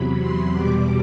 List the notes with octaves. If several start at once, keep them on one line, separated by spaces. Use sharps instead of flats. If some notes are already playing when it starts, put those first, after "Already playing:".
Already playing: E2 C3 F#3 B5
C6
E2 B2 G3 D6